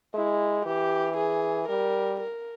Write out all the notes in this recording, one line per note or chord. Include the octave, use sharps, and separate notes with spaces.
G#3 E4
E3 G4
G#4
G3 A#4
A#4